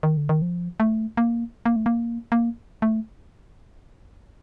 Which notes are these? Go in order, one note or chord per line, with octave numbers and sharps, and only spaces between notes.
D#3
D3
D#3
F3
A3
A#3
A#3
A3
A#3
A#3
A3